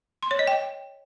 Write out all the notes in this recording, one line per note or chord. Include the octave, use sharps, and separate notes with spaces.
C6
C#5
D#5
G5